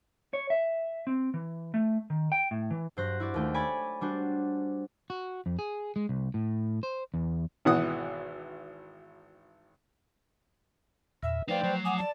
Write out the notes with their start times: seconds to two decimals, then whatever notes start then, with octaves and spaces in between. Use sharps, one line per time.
0.33 C#5
0.50 E5
1.07 C4
1.34 E3
1.74 A3
2.10 D#3
2.32 G5
2.51 A2
2.71 E3
2.97 G2 F#3 C5 F#6 A#6
3.20 E4 F#4 D5
3.34 D#2 A3 G5
3.54 C#5 D5 G#5 B5
4.01 G3 D4 F#4 C5
5.10 F#4
5.46 F2
5.59 G#4
5.96 G#3
6.09 C2
6.34 A2
6.83 C5
7.14 E2
7.65 G#1 B2 E3 F#5 D#6
11.23 E2 A#2 E5
11.48 F3 A3 D#4 B4 C5 D5 F5 G5
11.64 F#3
11.85 F#5 G#5 D6 D#6
11.98 D5 A5